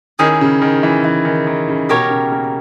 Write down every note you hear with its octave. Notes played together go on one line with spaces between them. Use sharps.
D#3 C#4 E4 G#4
C#3
D#3
E3
E3
D#3
D#3
C#3
B2 G4 A#4 C#5
C#3
A#3